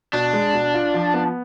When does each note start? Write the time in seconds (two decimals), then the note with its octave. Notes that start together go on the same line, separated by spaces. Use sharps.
0.13 B2 D4
0.33 G#3
0.53 B2
0.74 F4
0.94 F3
1.14 B3